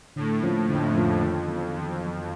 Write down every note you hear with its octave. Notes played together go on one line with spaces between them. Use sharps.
A2 D3
F3 A#3 C#4 F4
F2 D3
F3 A#3 C#4 F4
D#3
F#3 B3
F2 D#3
F#3 B3